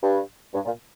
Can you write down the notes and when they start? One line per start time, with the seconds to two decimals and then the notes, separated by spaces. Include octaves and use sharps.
0.03 G2
0.54 G2
0.65 A#2